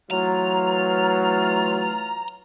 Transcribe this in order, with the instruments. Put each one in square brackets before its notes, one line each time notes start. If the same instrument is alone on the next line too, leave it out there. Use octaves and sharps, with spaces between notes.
[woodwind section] E3 A3 F4 [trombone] F#3 [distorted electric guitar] A#5